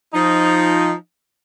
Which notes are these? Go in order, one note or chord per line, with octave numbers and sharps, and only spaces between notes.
F3 D#4